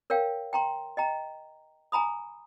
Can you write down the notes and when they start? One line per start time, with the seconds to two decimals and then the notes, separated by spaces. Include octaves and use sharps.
0.10 A#4 C#5 F5 G5
0.53 G5 A#5 C6
0.97 D#5 G5 A#5
1.92 G#5 A#5 B5 D#6